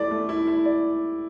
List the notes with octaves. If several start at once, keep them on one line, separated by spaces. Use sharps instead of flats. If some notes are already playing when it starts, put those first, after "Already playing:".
Already playing: A3 E4 D5
A3
E4
E4
D5